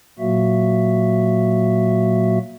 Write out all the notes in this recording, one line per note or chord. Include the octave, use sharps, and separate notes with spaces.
A#2 F#3 A#3 F#4 E5